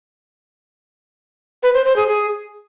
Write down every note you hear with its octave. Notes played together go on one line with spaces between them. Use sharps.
B4
C5
C5
G#4
G#4